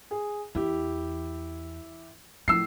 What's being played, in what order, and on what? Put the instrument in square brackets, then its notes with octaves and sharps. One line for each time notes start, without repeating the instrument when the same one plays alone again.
[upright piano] G#4
[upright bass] E2 [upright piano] E4 G4
[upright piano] A2 E6 C7 [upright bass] F3